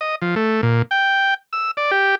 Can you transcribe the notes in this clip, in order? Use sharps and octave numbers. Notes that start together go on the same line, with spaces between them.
D#5
F3
A3
A#2
G5
E6
D5
G4